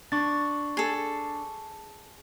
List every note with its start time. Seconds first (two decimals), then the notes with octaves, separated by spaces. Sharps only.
0.12 D4 C#6 A6
0.77 G#4 A4